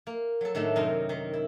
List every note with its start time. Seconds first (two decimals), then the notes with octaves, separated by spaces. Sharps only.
0.07 A#3
0.41 F#3 A4
0.55 A2 D#3 A3 D4
0.76 F#2 C3 D#4 A#4 C6
1.09 D#3
1.33 E4